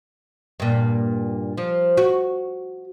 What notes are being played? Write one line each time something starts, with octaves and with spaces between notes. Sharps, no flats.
G2 A#2
F3
F#4